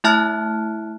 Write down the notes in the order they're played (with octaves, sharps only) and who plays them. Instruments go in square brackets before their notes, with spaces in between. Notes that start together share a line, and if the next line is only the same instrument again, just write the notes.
[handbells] A3 E4 E5 A5 F6 F#6